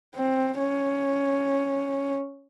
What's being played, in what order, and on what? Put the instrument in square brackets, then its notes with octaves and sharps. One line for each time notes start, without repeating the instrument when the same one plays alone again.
[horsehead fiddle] C4
C#4